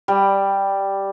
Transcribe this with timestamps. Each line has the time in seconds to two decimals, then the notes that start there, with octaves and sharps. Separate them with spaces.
0.08 G3